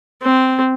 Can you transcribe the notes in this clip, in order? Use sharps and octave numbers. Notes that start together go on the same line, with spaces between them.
C4